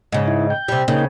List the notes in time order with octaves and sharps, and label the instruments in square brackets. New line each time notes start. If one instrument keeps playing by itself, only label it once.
[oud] G#2 C#3
[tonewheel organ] D#4 E4
G5
[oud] C3 G3
[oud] C#3 [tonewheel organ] A#3 D#4 G5